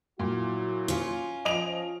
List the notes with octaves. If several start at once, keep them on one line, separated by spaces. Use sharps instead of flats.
A#2 F#3 E4 F#4
C#4 F4
F3 D#5 D7 F7